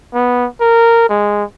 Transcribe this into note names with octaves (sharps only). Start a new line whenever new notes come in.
B3
A#4
G#3